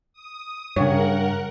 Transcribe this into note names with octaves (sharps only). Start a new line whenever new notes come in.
D#6
G2 C#3 A#4 C#5 F#5